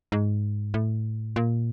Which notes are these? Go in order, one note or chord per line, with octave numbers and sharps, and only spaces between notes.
G#2
A2
A#2